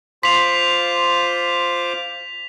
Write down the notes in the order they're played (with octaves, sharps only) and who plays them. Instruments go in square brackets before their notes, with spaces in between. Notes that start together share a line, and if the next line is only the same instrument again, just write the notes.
[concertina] F4 C5 D6 [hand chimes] C6 [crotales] B6 F7